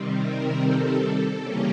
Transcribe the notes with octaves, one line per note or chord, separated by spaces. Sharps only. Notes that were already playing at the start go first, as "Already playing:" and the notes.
Already playing: C3 D#3 G3 C4
A#4
A4
C#3 E3 G3 A#3 C#4 G4